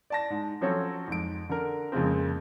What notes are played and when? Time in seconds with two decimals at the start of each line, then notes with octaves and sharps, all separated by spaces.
0.10 D5 A5 A#6
0.30 G#2
0.61 F3 F#3 C4 C#4 A4 C#5
1.08 F2 G#2 D7
1.49 D3 A#4
1.92 F2 C#3 G#3 A#3 C4